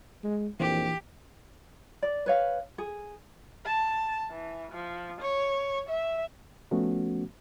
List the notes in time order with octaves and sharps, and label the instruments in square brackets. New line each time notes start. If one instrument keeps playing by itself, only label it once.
[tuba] G#3
[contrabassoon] A#1 [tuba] F2 [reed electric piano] E3 [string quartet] G4
[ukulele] D5
B4 C#5 F5
G#4
[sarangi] A5
E3
F3
C#5
E5
[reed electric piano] F3 A3 B3 C#4 F#4